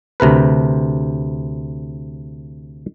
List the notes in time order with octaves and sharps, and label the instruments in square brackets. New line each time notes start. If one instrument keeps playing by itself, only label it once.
[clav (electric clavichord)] D2 C3 A#4 B4